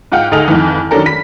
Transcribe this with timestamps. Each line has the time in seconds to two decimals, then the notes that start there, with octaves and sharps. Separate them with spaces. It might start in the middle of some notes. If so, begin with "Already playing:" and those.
0.12 G#2 F4 F#5 G5 F6
0.32 D2 D#4 G#4 A4 F6 F7
0.48 F2 D#3 E3
0.91 D#3 F#3 C#4 D4 A4 A#4
1.06 B5 B6